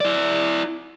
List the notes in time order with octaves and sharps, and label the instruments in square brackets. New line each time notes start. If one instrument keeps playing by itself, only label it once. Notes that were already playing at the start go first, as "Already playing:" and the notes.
[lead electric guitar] E4 D5